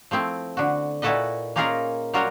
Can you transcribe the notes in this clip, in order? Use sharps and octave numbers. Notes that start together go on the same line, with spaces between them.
F3 A3 C4 E4
D3 F#4
A#2 E4 F#4 A4 B4 D#5
A#3 C#4 D#4 F4 G#4 A#4
F#3 G3 F4 F#4 A#4 C#5